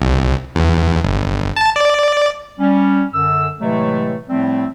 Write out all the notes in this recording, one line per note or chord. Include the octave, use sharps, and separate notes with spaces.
C2
E2
G1
A5
D5
G3 C#4
F#2 D3 E6
A2 C3 E3 F#3 G#3 A3
A2 F3 G3 A3 C4